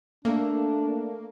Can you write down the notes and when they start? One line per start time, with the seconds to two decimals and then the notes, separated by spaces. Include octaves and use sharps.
0.25 A3 A#3 D4